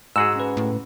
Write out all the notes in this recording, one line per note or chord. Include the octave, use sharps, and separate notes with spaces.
G#2 F#4 G#4 E6
C#4 B4
A2